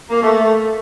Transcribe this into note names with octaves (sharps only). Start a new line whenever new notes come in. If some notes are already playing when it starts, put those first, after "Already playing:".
A#3
A3